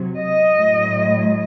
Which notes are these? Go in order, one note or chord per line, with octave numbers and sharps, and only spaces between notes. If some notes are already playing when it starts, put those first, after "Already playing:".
Already playing: C3 F#3
D#5
A2 F#3